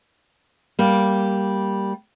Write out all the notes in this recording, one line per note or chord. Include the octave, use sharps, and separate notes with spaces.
G3 A#3